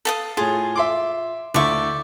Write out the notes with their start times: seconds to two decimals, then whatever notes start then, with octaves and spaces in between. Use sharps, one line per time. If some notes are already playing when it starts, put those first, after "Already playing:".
0.05 A4 F5 D#6
0.37 A2 F4 G#4
0.76 E5 C6 D6
1.54 D2 E4 D5 E5 C#6